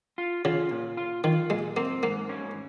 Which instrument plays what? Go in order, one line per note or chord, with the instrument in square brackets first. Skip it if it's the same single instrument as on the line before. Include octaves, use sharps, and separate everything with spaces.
[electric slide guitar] F4
[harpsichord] C#3 [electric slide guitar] F4
[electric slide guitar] A#2
F4
[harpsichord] D#3 [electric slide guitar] F4
[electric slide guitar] A#2 [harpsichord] G#3
[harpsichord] A#3 [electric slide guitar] C4
[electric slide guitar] G#2 [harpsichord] A#3
[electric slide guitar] C#4